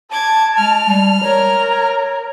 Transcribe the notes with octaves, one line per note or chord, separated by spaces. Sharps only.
A5 D6 G#6
G#3 F6 F7
G3
A#4 C#5